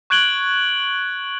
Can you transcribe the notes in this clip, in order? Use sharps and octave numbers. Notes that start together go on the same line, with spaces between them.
C#6 F#6 G#6 D7 F#7 G7